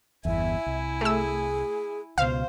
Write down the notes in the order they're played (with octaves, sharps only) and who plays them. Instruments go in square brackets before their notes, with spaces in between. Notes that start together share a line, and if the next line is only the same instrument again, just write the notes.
[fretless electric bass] G1 E2 [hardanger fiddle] E4 G#5 [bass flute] E5
[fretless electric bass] C2
[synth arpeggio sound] A3 E6 [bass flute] G#4
[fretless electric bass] C#2 B2 [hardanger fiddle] C5 [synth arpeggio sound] F5